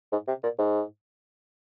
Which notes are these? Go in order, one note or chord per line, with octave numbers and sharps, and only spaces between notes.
G#2
C3
A#2
G#2